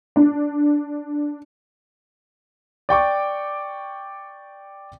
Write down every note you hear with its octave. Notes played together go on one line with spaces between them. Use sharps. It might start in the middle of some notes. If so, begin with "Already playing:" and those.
D4
D5 G5 C#6 D6